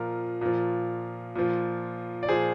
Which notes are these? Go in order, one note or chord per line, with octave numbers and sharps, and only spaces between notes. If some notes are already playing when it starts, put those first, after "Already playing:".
Already playing: A#2 F3 A#4
A#2 F3
A#2 F3
D5
A#2 F3 G#4 C5